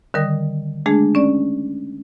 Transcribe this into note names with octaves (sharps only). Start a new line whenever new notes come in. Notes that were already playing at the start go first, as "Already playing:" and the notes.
D3 D#3 G3 A#4 D#6
G#3 A3 D4 G#4
C#4 D5